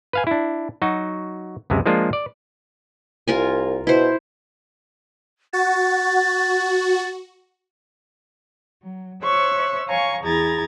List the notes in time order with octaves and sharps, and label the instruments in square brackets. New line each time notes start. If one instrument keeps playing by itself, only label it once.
[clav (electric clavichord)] B4 F5 G#5
D4 E4
F#3 D#4 F#4
C#2 F#2 C3 G#3
F3 G#3 A#3 D4 F4
D5
[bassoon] C2 [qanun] F4 A#4 G#5
[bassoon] B2 [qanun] E4 C5
[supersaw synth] F#4 [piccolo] A6
[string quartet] F#3
C5 C#5 E5 C#6 E6 F#6
C#5 F5 G#5 A#5 C#6
E2 E4 G#4 A#5 G#6 A6